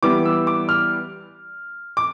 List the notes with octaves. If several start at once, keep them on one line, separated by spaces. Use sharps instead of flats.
E3 G3 B3 D6
E6
D6
F6
D6